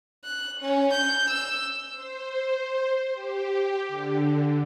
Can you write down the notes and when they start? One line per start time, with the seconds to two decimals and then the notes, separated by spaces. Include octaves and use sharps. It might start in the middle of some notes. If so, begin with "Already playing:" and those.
0.25 F#6
0.60 C#4
0.93 G6
1.30 E6
1.92 C5
3.13 G4
3.88 D3